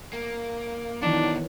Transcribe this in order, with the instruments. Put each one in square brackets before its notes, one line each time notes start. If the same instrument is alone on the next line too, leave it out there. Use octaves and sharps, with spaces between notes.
[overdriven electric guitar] A#3
[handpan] D#3 E3 F#3 [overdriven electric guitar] B3 D#4 [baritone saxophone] D4